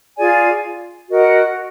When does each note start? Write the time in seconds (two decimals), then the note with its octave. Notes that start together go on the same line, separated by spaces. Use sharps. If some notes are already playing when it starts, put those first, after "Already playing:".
0.18 F4 G#4 D5 G#5
1.09 F#4 A#4 D#5 F#5